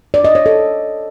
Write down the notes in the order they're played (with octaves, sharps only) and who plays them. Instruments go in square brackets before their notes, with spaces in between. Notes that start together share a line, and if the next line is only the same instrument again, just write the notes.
[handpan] D5
D#5
C#5
A4